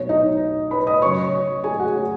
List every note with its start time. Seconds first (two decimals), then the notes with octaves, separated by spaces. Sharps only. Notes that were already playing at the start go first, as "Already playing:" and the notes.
Already playing: B1 B2 F#3 B3 C#5
0.09 D#4 D#5
0.71 B4 B5
0.87 D#5 D#6
1.02 F#2 C#3 F#3 C#5 C#6
1.64 G#4 G#5
1.80 F#4 F#5
1.95 C#5